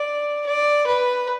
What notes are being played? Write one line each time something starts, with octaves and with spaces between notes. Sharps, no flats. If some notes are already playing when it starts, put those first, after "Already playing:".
Already playing: D5
D5
B4